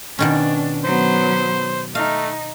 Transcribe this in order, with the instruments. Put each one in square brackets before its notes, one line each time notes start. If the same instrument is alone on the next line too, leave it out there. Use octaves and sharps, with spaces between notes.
[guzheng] B2 D#3 C#4 [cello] D4
[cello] F#3 B3 [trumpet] C5
[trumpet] A3 [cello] D#4 [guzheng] F5